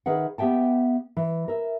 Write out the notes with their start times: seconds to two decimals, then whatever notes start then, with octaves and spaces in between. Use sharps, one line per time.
0.06 D#3 G#4 B4 E5 F#5
0.38 B3 G4 E5 G5 A5
1.17 E3
1.48 A#4 E5